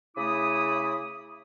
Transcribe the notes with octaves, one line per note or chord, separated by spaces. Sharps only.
C#3 A3 E4 B5 D6 D#6